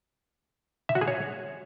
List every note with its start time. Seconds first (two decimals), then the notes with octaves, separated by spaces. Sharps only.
0.89 E5
0.95 F#4
1.01 G#4
1.08 C#5